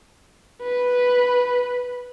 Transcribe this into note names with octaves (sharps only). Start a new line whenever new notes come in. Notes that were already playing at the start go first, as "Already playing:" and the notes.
B4